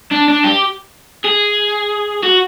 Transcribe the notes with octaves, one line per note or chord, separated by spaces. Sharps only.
D4
D4
G4
G#4
F#4